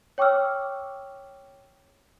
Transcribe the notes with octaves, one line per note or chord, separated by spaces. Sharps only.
C#5 G5 C#6 D6 E6 F6